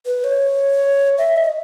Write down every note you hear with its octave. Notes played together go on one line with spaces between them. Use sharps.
B4
C#5
E5
D#5